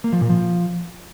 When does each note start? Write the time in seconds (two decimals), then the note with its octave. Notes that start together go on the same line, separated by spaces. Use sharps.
0.04 A#3
0.13 F3
0.21 A#2
0.29 F3